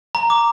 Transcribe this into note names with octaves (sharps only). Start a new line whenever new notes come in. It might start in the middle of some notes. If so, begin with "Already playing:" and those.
A#5
D6